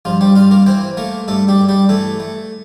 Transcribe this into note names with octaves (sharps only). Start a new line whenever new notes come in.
G2 F3 F4
G3 G4
G2 F4 F5
A#3 A#4
E3 C4 C5
A3 A#3 A#4
G2 A3 A4
G3 G4
G2
G3 G4
E3 A3 A4
A3